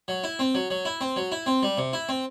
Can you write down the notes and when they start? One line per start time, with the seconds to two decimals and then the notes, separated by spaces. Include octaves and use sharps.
0.08 F#3
0.24 E4
0.39 C4
0.55 F#3
0.70 F#3
0.85 E4
1.01 C4
1.16 F#3
1.32 E4
1.46 C4
1.63 G3
1.78 C3
1.93 E4
2.09 C4